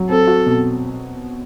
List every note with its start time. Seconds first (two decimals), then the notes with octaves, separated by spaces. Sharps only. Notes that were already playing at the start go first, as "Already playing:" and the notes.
Already playing: F#3
0.09 C4 A4
0.27 F#4
0.46 B2